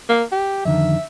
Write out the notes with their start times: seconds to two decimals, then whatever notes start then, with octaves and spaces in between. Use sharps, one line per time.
0.10 A#3
0.32 G4
0.65 F2 D3 D#3 E5